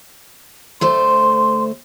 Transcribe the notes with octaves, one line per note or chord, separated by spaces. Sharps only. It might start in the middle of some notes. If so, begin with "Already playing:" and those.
D2 A3 C5 C6